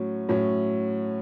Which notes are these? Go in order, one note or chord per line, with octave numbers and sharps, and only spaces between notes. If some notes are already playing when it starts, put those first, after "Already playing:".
Already playing: A2 F#3 C#4
A2 F#3 C#4